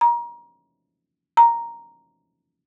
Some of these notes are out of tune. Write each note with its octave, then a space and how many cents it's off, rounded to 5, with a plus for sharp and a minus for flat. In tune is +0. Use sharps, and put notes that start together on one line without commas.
A#5 +30
A#5 +0